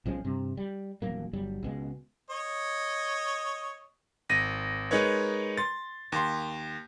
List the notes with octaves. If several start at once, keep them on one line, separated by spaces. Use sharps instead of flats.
B1 F3 G#3 C#4
G2 C3
G3
D#1 E2 F#3 A#3
G1 F#3 G3
C#2 B2 G#3
C#5 D#5
G#1 A#6 D#7
G#3 D#4 A#4 B4 C#5
C6 A6
D#2 C6